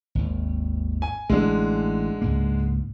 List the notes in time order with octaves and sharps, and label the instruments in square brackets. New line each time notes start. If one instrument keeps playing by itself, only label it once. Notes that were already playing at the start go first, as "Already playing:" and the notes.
[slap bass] G#1 D#2
[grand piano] G#5
[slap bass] A1 [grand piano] D3 G#3
[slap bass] C#2 G#2 A#3